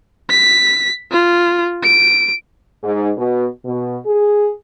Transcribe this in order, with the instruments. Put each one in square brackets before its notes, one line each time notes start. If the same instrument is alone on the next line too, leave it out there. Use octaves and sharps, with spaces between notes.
[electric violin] B6
F4
D7
[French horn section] G#2
B2
B2
G#4